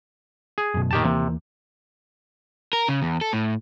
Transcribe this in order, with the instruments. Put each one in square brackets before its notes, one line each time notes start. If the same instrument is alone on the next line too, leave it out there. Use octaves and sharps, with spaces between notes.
[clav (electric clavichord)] G#4
[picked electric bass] F#2 B2
[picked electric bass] F1 A#2 [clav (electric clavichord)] D#3 G4 A5
[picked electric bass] D#2 E3 A#3 [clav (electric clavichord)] C3
[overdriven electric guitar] A#4
C#3
E2
A4
A2